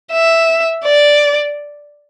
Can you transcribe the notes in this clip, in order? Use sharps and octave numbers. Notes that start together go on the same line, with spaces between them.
E5
D5